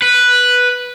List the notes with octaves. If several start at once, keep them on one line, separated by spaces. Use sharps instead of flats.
B4